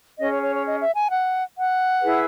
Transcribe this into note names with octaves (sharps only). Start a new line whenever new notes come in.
C#4 G#4 C#5 D#5
C#5
C#5
C#5
D#5
E5
G#5
F#5
F#5
E4 G#4 B4